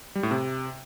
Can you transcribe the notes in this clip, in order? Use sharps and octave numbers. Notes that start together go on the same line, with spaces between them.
G3
A2
C3